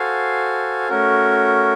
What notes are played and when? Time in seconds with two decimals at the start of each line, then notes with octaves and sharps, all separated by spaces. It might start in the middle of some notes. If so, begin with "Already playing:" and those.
Already playing: F#4 A4 C5 F5 G#5
0.89 A3 C#4 F#4 A#4